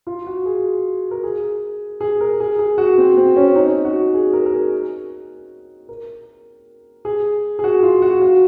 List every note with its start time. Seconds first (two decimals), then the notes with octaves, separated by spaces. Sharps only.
0.07 F4
0.27 F#4
0.46 G#4
1.11 A#4
1.23 G#4
2.01 G#4
2.21 A#4
2.40 G#4
2.59 G#4
2.78 F#4
2.98 C4
3.17 C4
3.36 C#4
3.56 D#4
3.85 F#4
4.14 G#4
4.33 A#4
4.46 A#4
4.53 G#4
5.89 A#4
7.05 G#4
7.59 G#4
7.64 F#4
7.83 F4
8.02 F#4
8.21 F#4